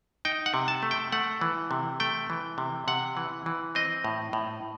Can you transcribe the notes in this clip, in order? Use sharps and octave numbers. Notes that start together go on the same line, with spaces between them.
D#4 G5
F#5
C3
A5
A3
G5
A3 F#5
E3
C3
A3 G5
E3
C3
C3 F#5
E3
E3
C4 D#5
A2
A2